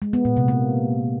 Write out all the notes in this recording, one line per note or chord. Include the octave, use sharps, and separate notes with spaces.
G#3
B3
A#2
C3
A#3